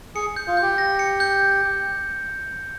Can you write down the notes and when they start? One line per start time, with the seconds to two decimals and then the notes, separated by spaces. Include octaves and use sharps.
0.15 G#4 C#7
0.36 G6
0.47 F4
0.57 G4 G6
0.78 A#6
0.99 C#7
1.20 G6